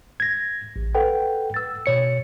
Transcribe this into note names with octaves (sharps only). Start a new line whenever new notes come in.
G#6 A#6
A1
A4 B4 F#5 G5
E6 A6
B2 C#5 C#7